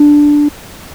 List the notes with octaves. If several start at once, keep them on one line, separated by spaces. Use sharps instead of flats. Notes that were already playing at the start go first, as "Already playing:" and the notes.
Already playing: D4